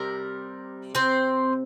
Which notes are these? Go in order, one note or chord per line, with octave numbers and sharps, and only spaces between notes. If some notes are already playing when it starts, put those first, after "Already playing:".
Already playing: C3 G3 A#4
C4 C5